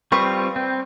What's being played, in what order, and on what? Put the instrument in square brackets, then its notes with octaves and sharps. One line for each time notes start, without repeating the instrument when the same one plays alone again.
[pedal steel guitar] G3 C4 F4 [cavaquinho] B4 C#6 D#6
[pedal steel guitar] C4